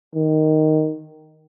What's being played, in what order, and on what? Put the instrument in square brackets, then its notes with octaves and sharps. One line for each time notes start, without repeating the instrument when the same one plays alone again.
[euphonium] D#3